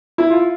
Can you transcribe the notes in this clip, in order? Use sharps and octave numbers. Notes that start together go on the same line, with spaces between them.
E4
F4